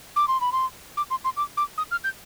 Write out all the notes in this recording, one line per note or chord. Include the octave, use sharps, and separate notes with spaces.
D6
C6
B5
C6
D6
C6
C6
D6
D6
D#6
F6
G6